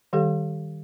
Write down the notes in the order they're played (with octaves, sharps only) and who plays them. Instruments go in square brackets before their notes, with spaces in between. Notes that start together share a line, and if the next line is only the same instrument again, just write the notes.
[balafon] D#3 G3 G4 A4 F5